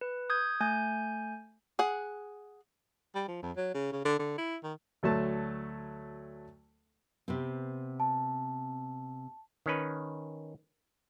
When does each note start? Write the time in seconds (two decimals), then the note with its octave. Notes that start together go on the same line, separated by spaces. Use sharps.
0.01 B4
0.30 D#6 G6 G#6
0.60 A3 G#5 G6
1.79 G#4 F#5
3.15 G3
3.28 F3
3.43 F2
3.56 F#3
3.74 C#3
3.92 C#3
4.05 D3
4.19 D3
4.38 E4
4.64 D#3
5.03 D2 F#3 A3 A5
7.28 C3 B3 C4
8.00 A5
9.66 D#3 C#4 B4